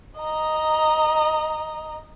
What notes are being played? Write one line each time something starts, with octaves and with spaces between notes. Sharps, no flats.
D#5 A#5